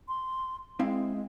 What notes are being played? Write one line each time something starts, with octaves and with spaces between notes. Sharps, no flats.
C6
G#3 C4 E4 F5